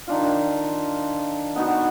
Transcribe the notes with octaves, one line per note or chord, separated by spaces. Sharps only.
D#3 D4 F4
B3 D#4 F#4